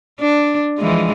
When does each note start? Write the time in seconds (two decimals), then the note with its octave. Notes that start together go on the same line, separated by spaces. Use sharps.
0.20 D4
0.78 E3 F3 G#3